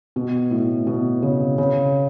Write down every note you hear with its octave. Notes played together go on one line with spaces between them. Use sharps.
B2
A2
B2
C#3
C#3